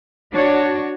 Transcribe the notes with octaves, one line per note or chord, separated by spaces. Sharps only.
D4 F#4 C#5